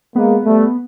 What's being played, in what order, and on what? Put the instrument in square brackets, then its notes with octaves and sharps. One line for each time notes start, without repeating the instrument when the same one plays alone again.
[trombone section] G#3 A#3 [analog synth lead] B3
[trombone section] G3 A3